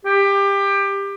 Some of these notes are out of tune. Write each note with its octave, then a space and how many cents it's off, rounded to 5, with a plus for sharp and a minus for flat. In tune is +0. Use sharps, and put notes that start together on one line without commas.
G4 +20